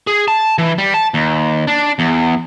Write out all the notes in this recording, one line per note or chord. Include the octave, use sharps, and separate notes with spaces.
G#4
A5
E3
G3
A5
D#2
D4
E2